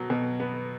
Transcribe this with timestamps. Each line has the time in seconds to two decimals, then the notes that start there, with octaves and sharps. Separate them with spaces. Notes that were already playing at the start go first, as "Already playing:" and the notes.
Already playing: B2 F#3
0.10 B2
0.40 B3